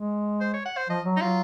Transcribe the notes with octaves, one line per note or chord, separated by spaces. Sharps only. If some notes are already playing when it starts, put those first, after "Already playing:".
Already playing: G#3
C5
C#5
F#5
C5
F3 D#5
F#3
D#4
F#3 F4